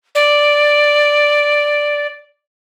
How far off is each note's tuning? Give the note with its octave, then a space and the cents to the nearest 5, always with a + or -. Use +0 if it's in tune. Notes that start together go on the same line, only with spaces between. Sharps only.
D5 +0